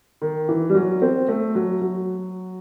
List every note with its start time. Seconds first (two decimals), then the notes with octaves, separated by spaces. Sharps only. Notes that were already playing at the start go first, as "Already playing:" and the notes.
0.22 D#3
0.49 E3
0.70 G3
0.75 F#3
1.02 C4
1.29 A3
1.55 F#3
1.81 F#3